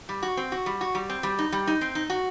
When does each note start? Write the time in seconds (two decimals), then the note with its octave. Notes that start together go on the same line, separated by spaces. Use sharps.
0.09 G3
0.23 F#4
0.37 C4
0.52 F#4
0.66 G3
0.81 F#4
0.95 G3
1.10 C4
1.23 G3
1.39 D#4
1.52 G3
1.67 D#4
1.81 C4
1.95 D#4
2.10 F#4